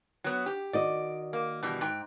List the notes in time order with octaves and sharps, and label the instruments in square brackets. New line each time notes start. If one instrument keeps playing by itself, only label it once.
[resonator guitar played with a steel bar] F#3 B3
G4
[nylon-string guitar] D#3 F#4 D#5 [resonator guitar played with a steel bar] D5
[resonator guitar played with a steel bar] A#3
B2 E3 G3
G#2 G5